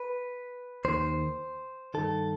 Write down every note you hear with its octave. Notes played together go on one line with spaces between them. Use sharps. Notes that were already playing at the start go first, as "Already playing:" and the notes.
Already playing: B4
D#2 D#3 C5
G2 D#3 A4